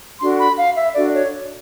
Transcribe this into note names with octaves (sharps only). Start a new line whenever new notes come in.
D4 F#4 A4 C6
B5
F5
E5
D4 F#4 A4 D5
C#5